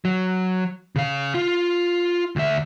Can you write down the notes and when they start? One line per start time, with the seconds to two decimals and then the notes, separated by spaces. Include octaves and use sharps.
0.05 F#3
0.96 C#3 F5
1.34 F4
2.36 D2 E5